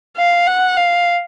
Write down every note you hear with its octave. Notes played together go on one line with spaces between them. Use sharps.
F5
F#5
F5